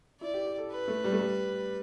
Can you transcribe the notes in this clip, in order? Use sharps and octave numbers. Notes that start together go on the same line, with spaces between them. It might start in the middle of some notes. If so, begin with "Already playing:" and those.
E4 D5
G4
G4
A4
B4
A3
G3
A3
G3